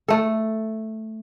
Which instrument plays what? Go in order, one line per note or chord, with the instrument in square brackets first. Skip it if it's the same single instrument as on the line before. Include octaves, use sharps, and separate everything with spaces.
[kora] A3 A4